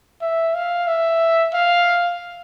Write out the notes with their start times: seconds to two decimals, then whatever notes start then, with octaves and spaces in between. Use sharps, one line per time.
0.21 E5
0.54 F5
0.87 E5
1.54 F5